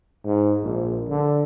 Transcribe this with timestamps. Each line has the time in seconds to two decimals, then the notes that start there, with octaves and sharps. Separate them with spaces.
0.25 G#2
0.63 A#1
1.09 D3